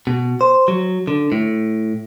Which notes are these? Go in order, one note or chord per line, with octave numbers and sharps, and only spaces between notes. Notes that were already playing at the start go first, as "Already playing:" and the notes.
B2
C5
F#3
D3
A2